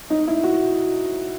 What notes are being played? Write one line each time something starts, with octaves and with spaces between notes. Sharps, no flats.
D#4
E4
F#4